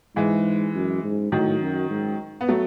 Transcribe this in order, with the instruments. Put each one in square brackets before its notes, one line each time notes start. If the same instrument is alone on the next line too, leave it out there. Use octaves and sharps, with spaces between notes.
[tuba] G#2 [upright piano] E3 G#3
[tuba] F#2
G#2
[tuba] A2 [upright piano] D#3 F#3
[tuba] F#2
G#2
[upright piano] B3
F#3 A3